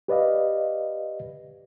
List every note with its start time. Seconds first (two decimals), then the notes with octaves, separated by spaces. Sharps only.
0.08 G4 B4 D5 D#5 F5